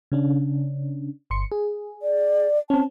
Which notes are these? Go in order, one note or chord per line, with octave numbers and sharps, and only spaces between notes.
C#3 C#4 D4
G1 C6 C#7
G#4
D5
C4 C#4 A5